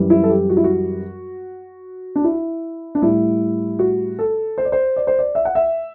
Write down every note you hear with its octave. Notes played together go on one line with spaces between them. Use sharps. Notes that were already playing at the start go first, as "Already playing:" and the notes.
Already playing: F#2 E3 G3
E4
A4
G4
F#4
E4
F#4
D4
E4
D4
A2 G3 E4
F#4
A4
C5
D5
C5
D5
C5
D5
E5
F#5
E5